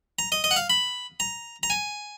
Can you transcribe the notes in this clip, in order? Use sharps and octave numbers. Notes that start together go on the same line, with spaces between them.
A#5
D#5
D#5
F#5
F5
B5
A#5
A#5
G#5